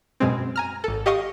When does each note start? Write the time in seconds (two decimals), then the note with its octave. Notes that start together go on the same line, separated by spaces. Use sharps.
0.20 F#2 B2 G#3 C4
0.56 G#5 A#5 F6
0.84 G#1 A4
1.06 G4 D#5 F5 C#6 D#6